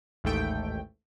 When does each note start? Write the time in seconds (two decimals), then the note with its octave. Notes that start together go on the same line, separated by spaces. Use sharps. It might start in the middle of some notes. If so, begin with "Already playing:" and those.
0.24 A1 D#2 G#2 A3 G5